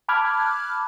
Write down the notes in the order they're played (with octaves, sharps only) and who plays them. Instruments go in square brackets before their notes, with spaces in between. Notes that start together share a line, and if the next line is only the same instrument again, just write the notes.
[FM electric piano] A5 B5 D6 F6 F#6 G#6